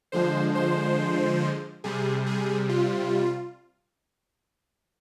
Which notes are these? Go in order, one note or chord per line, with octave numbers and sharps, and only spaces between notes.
D3 F3 G#3 C5
C5
C3 G3 G#4
G#4
F4